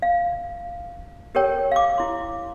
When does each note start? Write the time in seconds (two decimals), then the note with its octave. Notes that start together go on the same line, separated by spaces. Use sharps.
0.02 F5
1.35 G4 A4 A#4 C#5 G5
1.72 F5 D6
1.98 E4 C6